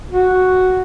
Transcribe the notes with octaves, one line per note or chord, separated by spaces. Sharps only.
F#4